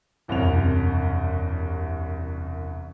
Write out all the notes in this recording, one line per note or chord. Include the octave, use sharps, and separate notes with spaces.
E1 C2 F#2 C3 C#5 F7